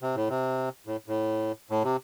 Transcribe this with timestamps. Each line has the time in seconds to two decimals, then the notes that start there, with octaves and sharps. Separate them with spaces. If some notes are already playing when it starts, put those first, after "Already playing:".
0.02 C3
0.15 A2
0.29 C3
0.87 A2
1.07 A2
1.70 A2
1.84 C3